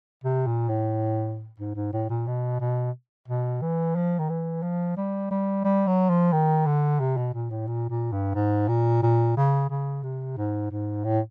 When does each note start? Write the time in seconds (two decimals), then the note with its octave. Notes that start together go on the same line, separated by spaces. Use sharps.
0.24 C3
0.47 A#2
0.69 A2
1.60 G#2
1.76 G#2
1.93 A2
2.10 A#2
2.27 B2
2.60 B2
3.28 B2
3.62 E3
3.96 F3
4.19 D#3
4.29 E3
4.63 F3
4.97 G3
5.31 G3
5.64 G3
5.87 F#3
6.10 F3
6.32 D#3
6.66 D3
7.00 C3
7.17 B2
7.34 A#2
7.50 A2
7.67 A#2
7.90 A#2
8.12 G2
8.35 G#2
8.68 A#2
9.03 A#2
9.37 C#3
9.70 C#3
10.03 C3
10.37 G#2
10.71 G#2
11.04 A2